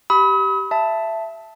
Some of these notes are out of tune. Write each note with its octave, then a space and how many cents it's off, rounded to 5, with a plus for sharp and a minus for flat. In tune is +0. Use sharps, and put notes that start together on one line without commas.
G4 -15 B5 +0 D#6 +45
E5 +10 A5 +0